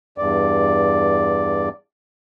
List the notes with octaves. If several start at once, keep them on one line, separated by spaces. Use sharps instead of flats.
E2 G2 D5